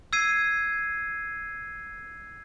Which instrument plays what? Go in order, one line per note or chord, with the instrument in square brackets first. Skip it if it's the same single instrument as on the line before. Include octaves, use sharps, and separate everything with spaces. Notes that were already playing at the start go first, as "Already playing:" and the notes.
[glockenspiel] E6 G#6 C7 D#7